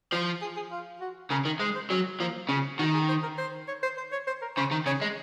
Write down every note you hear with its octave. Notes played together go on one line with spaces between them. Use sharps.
F3 C5
G#4
G#4
F4
F#4
C#3 A#4
D#3
G#3 C5
C5
F#3 C#4
F3 A#3
C#3
D#3 F#4
G#4
C5
A#4
C5
C#5
C5
C5
C#5
C5
A#4
C#3 C5
D#3
C#3 C#5
G#3